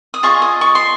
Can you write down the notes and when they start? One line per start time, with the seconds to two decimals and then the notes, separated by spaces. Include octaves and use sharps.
0.14 D#6
0.23 F4 G#4 D#5 C#6
0.42 D#6
0.61 C#6
0.75 C6